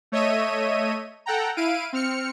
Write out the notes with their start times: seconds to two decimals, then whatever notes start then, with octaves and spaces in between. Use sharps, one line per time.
0.12 A3 C#5 D#5 E5 D#7
1.26 A4 F#5 G5 A#5
1.57 E4 F5 D7 D#7
1.93 C4 F6 C#7